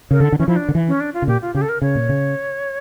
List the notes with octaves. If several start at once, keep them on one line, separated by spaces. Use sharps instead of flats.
C#3 A#4
D3 A4
D3
E3 C#4
F3 E4
D4
D3
E3
C#4
D4
F4
C#3
A#2 G4
F4
C#3 G4
A4
A#4
C#3 C#5
A#2
C#3